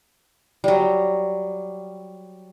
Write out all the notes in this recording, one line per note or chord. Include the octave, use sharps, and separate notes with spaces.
F#3 G3